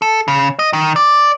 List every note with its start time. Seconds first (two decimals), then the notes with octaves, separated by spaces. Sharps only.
0.02 A4
0.28 C#3
0.59 D#5
0.73 D#3
0.96 D5